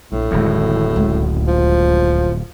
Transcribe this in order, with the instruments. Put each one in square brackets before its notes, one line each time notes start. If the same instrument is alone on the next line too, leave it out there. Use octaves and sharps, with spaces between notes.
[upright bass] A#1 F2 [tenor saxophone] A2
[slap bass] D1 F2 [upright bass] D#3 G#3
[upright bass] C#2 G#3
[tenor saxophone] F3